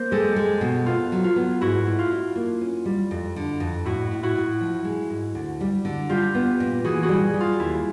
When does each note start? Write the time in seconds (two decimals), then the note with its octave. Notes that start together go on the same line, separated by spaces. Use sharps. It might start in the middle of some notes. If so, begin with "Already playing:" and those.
Already playing: A#3 C5
0.11 G#3 G4 A4
0.36 G#3
0.61 B2
0.86 B3 F4
1.12 F#3
1.24 F4
1.36 B3
1.61 G#2 E4 F#4
1.87 A3
1.99 F4
2.12 D4
2.35 A#3
2.61 C#4
2.86 G3
3.11 F2
3.36 D3
3.60 F2
3.85 A2 E4 F#4
4.11 A2
4.23 E4 F#4
4.35 A2
4.61 F3
4.85 G#3
5.10 G#2
5.35 D2
5.61 G3
5.85 D3
6.09 G3 F4 G4
6.35 B3
6.60 A#2
6.84 E3 F#4 G#4
7.03 F#4 G#4
7.09 G3
7.34 G3
7.40 F4
7.59 D#2 E4